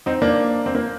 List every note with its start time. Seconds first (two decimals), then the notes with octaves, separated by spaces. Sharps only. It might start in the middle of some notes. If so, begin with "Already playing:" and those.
0.06 C4 D#4
0.22 A#3 D4
0.66 C4
0.75 A#3